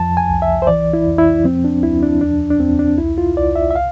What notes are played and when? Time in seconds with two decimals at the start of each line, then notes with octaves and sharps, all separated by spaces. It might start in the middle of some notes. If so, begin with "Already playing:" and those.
Already playing: F2 F3 A5
0.17 G#5
0.29 C2
0.42 E5
0.62 C5
0.67 E3 D5
0.93 E4
1.06 F2
1.18 E4
1.44 F3 C4
1.64 D4
1.82 D2 E4
2.03 D4
2.21 E2 D4
2.50 D4
2.60 E2 C4
2.79 D4
2.98 C2 E4
3.18 F4
3.37 C2 D5
3.56 E5
3.71 E5
3.76 F5